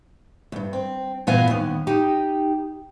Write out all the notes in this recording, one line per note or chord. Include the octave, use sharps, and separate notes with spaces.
E2 G2
C4
G2 A#2 E3 B3 F5 G#5
D#2 B3
D#4 G4